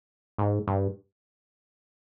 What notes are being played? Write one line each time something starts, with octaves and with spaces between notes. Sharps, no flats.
G#2
G2